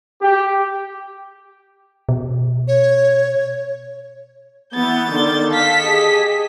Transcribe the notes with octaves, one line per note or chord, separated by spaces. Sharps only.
G4
B2
C#5
E3 B3 G6 A6
D3 D#3 D5
A4 F5 B6
G4 G#4 D#5